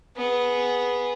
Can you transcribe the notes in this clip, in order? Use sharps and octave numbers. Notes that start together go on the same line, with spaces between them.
B3 G#4